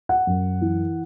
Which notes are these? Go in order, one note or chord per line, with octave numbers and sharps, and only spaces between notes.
F#5
F#2
E3